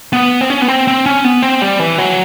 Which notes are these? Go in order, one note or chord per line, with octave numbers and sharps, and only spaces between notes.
B3
C4
C#4
B3
C4
C4
C#4
B3
C4
G3
E3
F#3